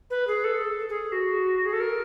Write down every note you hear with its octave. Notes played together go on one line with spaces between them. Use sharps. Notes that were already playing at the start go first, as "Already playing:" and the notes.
B4
G#4
A4
G#4
F#4
G#4
A4
A#4